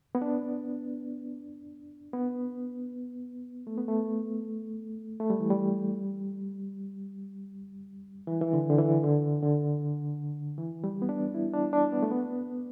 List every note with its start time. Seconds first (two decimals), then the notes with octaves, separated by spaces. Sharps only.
0.15 B3
0.22 D4
2.13 B3
3.67 A3
3.77 B3
3.88 A3
5.20 A3
5.30 G3
5.40 E3
5.50 G3
8.27 E3
8.41 E3
8.53 D3
8.70 D3
8.78 E3
9.04 D3
9.42 D3
10.58 E3
10.84 G3
11.02 B3
11.09 D4
11.34 E4
11.54 D4
11.73 D4
11.92 B3
12.03 A3
12.11 B3